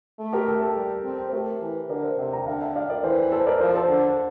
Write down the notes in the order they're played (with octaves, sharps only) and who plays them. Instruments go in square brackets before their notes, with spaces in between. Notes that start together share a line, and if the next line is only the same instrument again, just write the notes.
[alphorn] A3
[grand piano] G4 A#4
A4
A4
[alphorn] G3
C4
[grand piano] C5
[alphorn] A3 [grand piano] G4 A#4
[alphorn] E3
[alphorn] D3 [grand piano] A#4 D5
[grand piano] C5 E5
[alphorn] C3 [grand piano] E5 G5
[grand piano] G5 A#5
[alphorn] D3 [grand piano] F5 A5
[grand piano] E5 G5
D5 F5
A#4 D5
[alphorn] E3 [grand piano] A4 C5
[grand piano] A4 C5
A#4 D5
[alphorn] F3 [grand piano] A4 C5
[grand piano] A4 C5
[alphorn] D3